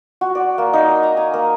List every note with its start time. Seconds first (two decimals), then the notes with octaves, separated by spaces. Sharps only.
0.21 F#4
0.35 D5
0.58 A#3
0.73 D#4
0.89 G#5
1.03 A#5
1.17 G#5
1.34 A#3